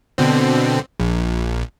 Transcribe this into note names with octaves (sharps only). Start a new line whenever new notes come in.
B2 D3 C4
A#1